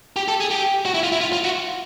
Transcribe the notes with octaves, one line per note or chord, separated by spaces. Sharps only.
G4
A4
G#4
G4
F#4
E4
F4
E4
F4
F4
F#4